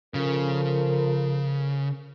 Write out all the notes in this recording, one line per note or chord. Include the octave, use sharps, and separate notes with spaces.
C#3 F3 A4 A#4